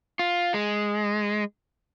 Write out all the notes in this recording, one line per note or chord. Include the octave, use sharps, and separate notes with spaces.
F4
G#3